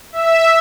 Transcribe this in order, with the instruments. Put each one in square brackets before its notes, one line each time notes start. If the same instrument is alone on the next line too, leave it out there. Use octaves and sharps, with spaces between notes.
[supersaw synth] E5